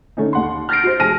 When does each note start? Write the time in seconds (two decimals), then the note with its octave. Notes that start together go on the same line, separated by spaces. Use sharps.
0.17 D3 A3 C#4 D#4
0.33 D#2 F#5 C6
0.69 F6 G6 A6 A#6 C7 D7
0.83 F#4 C5
0.99 F1 G#4 A5 F6 A#6 D#7